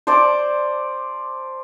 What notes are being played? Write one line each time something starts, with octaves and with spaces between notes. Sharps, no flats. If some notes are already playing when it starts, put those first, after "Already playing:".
C5 D5 A5 D6